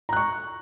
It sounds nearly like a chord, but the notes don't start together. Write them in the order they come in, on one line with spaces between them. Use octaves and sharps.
A#5 F#6 C#6